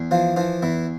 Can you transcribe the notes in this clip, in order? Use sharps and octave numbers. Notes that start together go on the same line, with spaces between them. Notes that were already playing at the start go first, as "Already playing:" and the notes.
Already playing: E2
E3 F3 F4
E3 F3 F4
E2 E3 E4